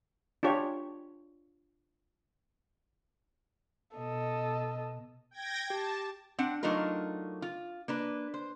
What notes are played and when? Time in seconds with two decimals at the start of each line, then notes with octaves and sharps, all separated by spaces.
0.43 D4 F4 G4 C#5
3.97 B2 A4 D#5
5.31 G5 G#6 A#6
5.70 G4 A5
6.38 C4 D4 F#5
6.63 F#3 A3 D4 D#4 F4 A#4
7.42 F4
7.88 A#3 D4 B4
8.34 C5